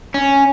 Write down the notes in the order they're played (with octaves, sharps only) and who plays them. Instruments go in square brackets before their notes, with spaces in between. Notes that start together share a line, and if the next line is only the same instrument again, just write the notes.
[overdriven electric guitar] C#4